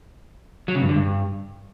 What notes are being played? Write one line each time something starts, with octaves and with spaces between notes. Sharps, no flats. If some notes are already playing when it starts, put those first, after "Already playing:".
F#3
C#3
G2
D3
G2